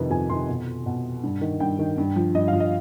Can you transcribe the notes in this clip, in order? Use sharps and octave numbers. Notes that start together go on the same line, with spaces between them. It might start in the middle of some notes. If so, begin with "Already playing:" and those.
Already playing: F2 C3 D#3 B4
F2 G#5
C3 D#3 C6
B2
B2
G2
D#3
G2 G5
D#3
G2
F3
G2 D#5
F5
F3
D#5